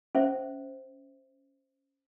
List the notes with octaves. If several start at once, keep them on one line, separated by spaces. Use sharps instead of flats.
C#4 C5 E5